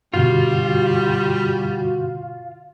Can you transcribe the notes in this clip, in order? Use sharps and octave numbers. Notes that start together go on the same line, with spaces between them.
G2 B2 D3 G3 F4 F#4